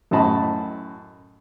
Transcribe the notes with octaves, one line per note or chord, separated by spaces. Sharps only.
F#2 A2 D#5 A5 B5